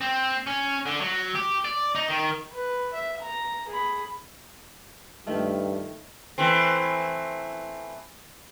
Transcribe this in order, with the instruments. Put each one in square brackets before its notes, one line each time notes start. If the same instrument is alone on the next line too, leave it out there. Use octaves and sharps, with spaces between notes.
[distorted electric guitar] C4
C#4
D3
F#3
G4
D5
D#4
D#3
[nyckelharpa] B4
E5
A#5
G#4 B5
[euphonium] G2 [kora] D#3 F3 A3
[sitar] E3 A3 C4